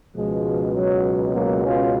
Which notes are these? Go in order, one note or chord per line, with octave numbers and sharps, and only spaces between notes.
C#2 B2 F3 G#3
F#3
F#3 A#3
C#4 F4